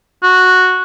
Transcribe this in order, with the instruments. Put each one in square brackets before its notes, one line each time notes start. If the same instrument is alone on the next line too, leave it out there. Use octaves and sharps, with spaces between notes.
[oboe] F#4